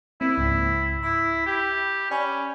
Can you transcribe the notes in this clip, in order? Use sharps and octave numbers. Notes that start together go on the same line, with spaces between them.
A#3 C4 E4
C#2 G#2
E4 B5
G4
C#4 D5 G#5 B5